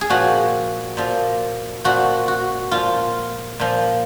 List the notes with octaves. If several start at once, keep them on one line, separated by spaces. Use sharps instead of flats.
G#4
A#2 F3 F#4
A#2 F3
A#2 F3 F#4
F#4
A#2 F3 F4
A#2 F3